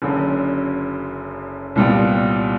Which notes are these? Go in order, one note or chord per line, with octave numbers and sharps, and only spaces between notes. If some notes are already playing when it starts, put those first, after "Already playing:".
F#1 F#2 D3
C2 A#2 G3 B3 E4